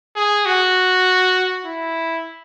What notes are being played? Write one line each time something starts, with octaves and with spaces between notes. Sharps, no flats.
G#4
F#4
E4